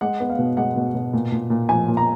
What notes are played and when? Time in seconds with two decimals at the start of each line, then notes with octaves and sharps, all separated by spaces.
0.01 G#3 F#5
0.20 B3
0.30 F5
0.39 B2
0.57 G#3 F#5
0.76 B2
0.95 B2
1.13 A#2
1.32 A#2
1.50 A#2
1.69 F3 G#5
1.88 A#2
1.97 A#5